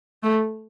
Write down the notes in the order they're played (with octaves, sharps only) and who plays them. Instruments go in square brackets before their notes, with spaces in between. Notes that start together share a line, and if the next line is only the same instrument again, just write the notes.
[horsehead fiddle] A3